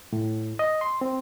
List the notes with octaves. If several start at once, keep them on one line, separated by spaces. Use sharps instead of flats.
A2
D#5
C6
C4